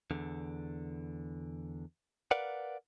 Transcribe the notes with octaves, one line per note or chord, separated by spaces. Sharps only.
E2 D3
A#4 B4 D5 F5 F#5